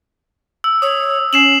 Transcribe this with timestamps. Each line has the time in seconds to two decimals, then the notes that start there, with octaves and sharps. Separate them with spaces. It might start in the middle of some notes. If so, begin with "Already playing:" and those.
0.64 E6
0.82 C#5 D#6
1.33 C#4 C7 E7 F#7